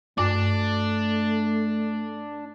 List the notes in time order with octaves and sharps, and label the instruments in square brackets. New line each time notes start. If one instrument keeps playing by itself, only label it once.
[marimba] G2 D6 [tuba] A3 [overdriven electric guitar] D4